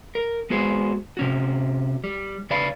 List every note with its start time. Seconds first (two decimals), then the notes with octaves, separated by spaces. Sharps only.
0.15 A#4
0.50 G#3 B3 F#4 G#4 C5
1.17 C3 C#4 F#4
2.04 G3
2.50 C#3 B4 D5 F5 B5